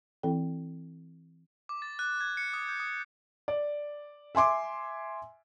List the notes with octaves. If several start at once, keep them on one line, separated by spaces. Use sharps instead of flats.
E3 C4 E4 A4 G5
D6
A6
F#6
G#6
C#7
D#6
G6
D#6
D5
E5 G#5 C6 D6